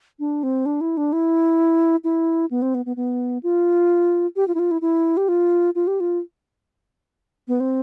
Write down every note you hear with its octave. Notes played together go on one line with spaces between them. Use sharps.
D4
C4
D4
E4
D4
E4
E4
B3
C4
B3
B3
B3
F4
G4
F4
E4
F4
E4
E4
G4
F4
F4
G4
F4
B3
C4